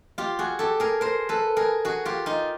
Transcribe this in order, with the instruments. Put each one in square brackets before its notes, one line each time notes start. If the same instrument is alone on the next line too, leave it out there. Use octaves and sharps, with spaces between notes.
[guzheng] F4 G4
F#4 G#4
G4 A4
G#4 A#4
A#4 C5
A4 B4
G#4 A#4
F#4 G#4
F4 G4
D#4 F4